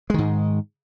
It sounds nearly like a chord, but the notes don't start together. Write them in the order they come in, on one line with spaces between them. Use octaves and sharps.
G#3 D#3 G#2